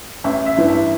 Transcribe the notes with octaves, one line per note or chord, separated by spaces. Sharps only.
A1 E5
E5
G2 E3
E5